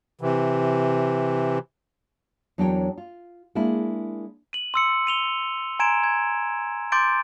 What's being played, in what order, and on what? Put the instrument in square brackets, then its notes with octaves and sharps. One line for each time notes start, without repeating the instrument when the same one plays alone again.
[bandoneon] C3 E3
[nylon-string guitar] E2 F#3 D4 A#4 C#5 G5
F4
G#3 A#3 D4 E4
[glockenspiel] D#7 F#7
C6 E6 C#7
D#7 F7 G7
G#5 A#5 C6 G#6 D7 E7
G#6
C6 D6 G6 A6 D7